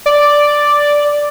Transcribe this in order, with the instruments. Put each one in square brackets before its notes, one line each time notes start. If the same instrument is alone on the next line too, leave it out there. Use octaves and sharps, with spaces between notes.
[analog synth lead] D5